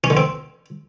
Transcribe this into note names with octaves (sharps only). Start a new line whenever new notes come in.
C#4
D3
C4